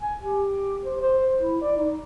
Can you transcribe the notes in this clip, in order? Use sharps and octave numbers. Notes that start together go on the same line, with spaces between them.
G#5
G4
C5
C5
E4
D5
D#4